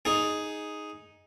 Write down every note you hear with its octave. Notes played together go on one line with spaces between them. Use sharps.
D#4 G#4